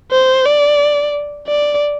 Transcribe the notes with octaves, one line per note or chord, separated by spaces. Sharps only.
C5
D5
D5